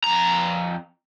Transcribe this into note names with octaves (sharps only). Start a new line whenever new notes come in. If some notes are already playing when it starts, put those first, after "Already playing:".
F2 A#5